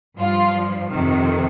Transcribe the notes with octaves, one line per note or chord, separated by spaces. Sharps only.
G2 F3 F4
F2 C3 D#3